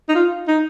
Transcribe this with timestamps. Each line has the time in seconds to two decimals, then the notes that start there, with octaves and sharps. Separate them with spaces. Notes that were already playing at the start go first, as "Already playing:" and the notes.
0.09 D#4
0.15 F4
0.48 D#4